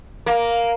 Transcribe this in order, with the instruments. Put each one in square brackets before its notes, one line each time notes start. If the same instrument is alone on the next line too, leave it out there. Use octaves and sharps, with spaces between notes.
[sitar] A#3